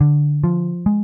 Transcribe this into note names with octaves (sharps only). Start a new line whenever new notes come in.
D3
F3
G#3